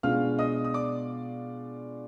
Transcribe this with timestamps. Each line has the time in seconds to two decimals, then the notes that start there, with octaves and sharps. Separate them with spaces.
0.03 B2 G#3 D4 F4 F5 F6
0.39 D#5 D#6
0.65 D#6
0.74 D5 D6